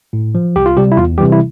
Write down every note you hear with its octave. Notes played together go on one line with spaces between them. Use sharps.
A2
F3
C2 G4
F4
C3 G3 G4
E4
E2 F4
C3 E3 G3 G4
E4